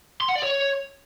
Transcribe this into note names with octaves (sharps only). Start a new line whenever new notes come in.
C6
F#5
D5
C#5